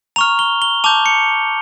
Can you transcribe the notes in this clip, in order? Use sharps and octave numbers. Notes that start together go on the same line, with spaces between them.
A#5 C#6 F6 F7
G7
G7
A5 D6 G6 F7
C#7